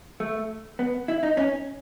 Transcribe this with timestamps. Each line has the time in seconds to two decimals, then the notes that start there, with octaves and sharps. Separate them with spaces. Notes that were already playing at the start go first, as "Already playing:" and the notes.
0.20 A3
0.79 B3
1.08 E4
1.23 D#4
1.37 C#4